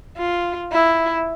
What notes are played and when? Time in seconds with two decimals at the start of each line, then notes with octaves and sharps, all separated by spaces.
0.18 F4
0.72 E4